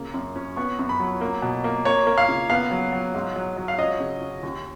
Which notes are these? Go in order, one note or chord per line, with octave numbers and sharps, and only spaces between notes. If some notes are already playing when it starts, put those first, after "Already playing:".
Already playing: C#3 A#3
F#2
C#4
B3 C#6
F#2
B5
F#3
A#3
B2
A#3
A#3 C#5
A#3
F5
C#3
B3 F5
F#3
F#3
G#2
F#3
F#3
F5
C#4 D#5
C#3
C#4
D#2